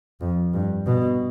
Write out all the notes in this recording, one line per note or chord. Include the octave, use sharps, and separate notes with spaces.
F2
G2
B2